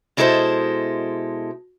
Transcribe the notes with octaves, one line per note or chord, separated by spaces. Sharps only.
B2 G#3 E4 A4 B4 C5